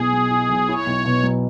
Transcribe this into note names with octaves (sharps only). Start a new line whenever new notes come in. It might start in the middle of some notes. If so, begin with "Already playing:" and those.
Already playing: B1 B2 E4 G#4
F#3
E4
B1
E4 C#5
B1
B2
F#3